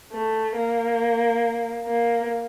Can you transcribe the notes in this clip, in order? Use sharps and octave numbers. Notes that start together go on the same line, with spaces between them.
A3
A#3
A#3